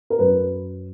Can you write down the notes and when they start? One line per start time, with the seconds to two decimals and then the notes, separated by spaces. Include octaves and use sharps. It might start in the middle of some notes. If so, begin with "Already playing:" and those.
0.10 A#4
0.19 F#2 B4